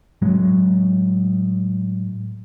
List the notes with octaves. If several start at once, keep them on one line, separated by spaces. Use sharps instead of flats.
A2 F#3 G#3